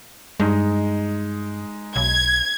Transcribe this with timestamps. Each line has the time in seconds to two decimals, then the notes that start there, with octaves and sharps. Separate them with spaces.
0.40 G2 G#3 D#4
1.96 B1 G#6